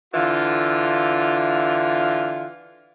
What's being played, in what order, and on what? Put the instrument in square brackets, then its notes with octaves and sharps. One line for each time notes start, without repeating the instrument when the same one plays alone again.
[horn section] D3 E3 F4